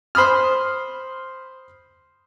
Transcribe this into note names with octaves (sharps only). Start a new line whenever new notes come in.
C5 B5 D#6 F6